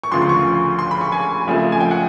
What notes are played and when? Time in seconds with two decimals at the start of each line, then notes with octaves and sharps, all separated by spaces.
0.04 C#6
0.12 D2 C#3 F3 C6
0.22 C6
0.29 C#6
0.79 C6
0.91 B5
1.01 C#6
1.12 G#5
1.47 F2 C#3 F3 A3 C4
1.72 G#5
1.80 G5
1.91 F#5